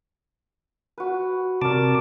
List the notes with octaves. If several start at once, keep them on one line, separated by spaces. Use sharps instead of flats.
F#4 B4
C3 A#4 D5 A5 D6